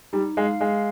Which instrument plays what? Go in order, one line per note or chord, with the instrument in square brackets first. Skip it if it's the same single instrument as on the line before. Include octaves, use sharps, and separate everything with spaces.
[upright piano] G3 [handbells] D#4
[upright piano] G#3 [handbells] F5
[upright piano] G#3 [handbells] F5